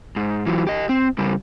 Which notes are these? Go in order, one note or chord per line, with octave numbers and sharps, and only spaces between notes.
G#2
E3 F#3
G4 D#5
C4
C#3 G3